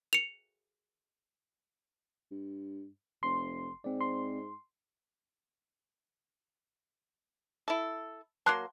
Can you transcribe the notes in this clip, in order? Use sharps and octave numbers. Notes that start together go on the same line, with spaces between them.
C#7 F7
G2
F1 C6
G#2 C4 D5
C6
E4 A4
F#3 A#3 A5 C6 F#6 C7